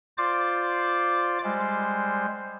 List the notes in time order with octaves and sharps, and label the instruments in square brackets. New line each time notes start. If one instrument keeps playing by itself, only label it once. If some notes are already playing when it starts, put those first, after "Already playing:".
[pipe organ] F4 C5 D5 D6
G3 G#3 C5